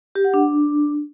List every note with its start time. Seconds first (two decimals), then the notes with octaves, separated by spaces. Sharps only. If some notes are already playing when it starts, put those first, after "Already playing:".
0.15 G4
0.25 F#5
0.34 D4